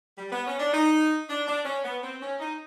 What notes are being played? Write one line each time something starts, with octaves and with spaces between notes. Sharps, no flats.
G3
B3
C#4
D4
D#4
D4
D4
C#4
B3
C4
C#4
D#4